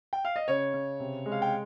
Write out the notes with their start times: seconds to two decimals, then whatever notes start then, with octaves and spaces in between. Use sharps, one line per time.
0.13 G5
0.25 F5
0.36 D#5
0.48 C#3 C#5
0.74 C#3
1.00 C3
1.26 G#3
1.32 F5
1.42 G5